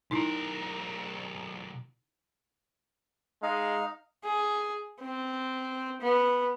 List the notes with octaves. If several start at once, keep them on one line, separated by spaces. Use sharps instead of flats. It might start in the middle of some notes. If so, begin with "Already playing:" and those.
B1 D#4 E4 A#4
G#3 D#4 F5
G#4
C4
B3